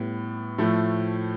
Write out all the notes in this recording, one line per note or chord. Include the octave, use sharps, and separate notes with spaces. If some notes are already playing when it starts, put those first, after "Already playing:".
Already playing: A2 G3 B3
A2 F3 A3